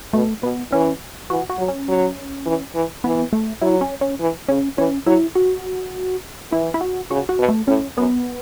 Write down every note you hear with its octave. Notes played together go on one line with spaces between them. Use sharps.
B2 A3
B2 B3
E3 C#4
E3 F#4
F#4
F#3
C#4
F#3
E3
E3
E3 B3
A3
F#3 E4
C#4
C#4
E3
C#3 C#4
E3 C#4
F#3 E4
F#4
E3 E4
E4
F#4
C#3 F#4
F#4
B2
A3
A2 C#4
F#2 B3